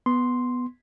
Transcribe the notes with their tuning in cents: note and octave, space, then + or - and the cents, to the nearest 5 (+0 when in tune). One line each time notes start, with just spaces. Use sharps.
B3 +0 C6 +0